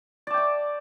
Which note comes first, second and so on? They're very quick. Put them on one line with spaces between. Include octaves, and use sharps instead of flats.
D5 A5 G5 D6